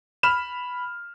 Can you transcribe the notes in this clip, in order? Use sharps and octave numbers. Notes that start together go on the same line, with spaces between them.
B5 F6 E7